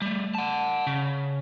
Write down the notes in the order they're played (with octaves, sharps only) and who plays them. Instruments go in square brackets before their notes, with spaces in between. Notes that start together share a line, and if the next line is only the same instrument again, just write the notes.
[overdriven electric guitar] G3 A3
F#5 A5
C#3